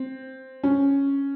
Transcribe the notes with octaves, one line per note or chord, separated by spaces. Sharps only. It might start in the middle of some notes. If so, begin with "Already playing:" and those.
Already playing: C4
C#4